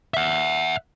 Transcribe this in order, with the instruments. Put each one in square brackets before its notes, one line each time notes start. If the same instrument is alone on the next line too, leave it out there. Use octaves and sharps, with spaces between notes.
[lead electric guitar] E5 F#5